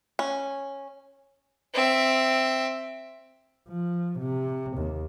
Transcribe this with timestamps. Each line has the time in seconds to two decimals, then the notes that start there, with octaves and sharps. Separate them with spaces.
0.19 C#4
1.74 C4 E5
3.68 F3
4.19 C3
4.77 D#2